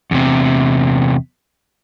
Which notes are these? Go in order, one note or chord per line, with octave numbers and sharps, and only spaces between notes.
E2 C3